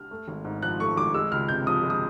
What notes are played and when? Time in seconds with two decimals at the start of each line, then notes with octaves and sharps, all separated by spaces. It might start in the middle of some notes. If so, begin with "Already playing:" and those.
Already playing: F6
0.11 A3
0.28 G#1
0.45 G#2
0.62 F3 F#6
0.80 A3 C#6
0.97 G#1 D6
1.14 G#3 E6
1.32 C#2 F6
1.48 C3 G6
1.67 F3 D#6
1.83 G#3
1.90 D#6